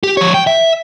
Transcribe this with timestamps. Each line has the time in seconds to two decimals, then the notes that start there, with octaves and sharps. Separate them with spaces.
0.03 G4
0.17 F3 C#5
0.34 G5
0.47 E5